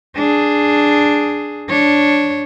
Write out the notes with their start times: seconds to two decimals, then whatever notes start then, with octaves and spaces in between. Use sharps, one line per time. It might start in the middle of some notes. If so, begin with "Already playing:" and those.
0.16 D4 G#4
1.70 D4 C#5